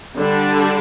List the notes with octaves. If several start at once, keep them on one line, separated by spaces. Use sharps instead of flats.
D3 G3 D4